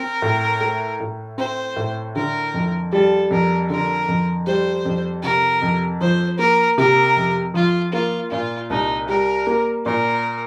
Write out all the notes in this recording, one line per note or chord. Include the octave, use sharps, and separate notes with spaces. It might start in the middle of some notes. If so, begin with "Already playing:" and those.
Already playing: C4 A#4
A2
A3
A2
C4 C5
A2
D3 A#4
F2
G3 A4
F2 A#4
D3 A#4
F2
G3 C5
F2
C3 A#4
F2
F3 C5
A#3 A#4
C3 A#4
F2
F3 F4
A#3 F4
A#2 F4
C2 D#4
G3 A#4
A#3
A#2 A#4